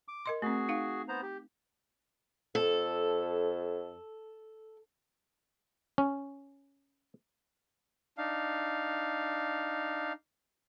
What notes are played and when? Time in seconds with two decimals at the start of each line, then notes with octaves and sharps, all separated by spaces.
0.08 D6
0.26 A#4 D#5 C6
0.42 A3 C4 F#4 G#4
0.69 D#4 F5
1.08 B3 C5 A#5
1.22 G4
2.55 F2 A4
5.98 C#4
8.18 D4 D#4 F5